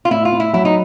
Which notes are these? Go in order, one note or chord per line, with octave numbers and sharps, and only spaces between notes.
F4
A2 E4
F4
A2
E4
F#3 E4
D#4